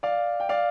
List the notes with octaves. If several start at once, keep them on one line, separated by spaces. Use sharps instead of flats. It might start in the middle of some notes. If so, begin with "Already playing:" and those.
D5 F5
G5
D5 F5